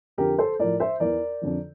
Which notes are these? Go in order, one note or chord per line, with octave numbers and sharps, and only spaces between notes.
F2 D3 F3 G4 A#4
A4 C5
A2 F3 A#4 D5
C5 E5
E2 E3 A#4 D5
F2 D3 F3